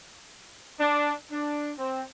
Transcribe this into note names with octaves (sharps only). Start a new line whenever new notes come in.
D4
D4
C4